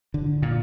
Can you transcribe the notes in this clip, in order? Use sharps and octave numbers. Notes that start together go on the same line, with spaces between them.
D3
A#2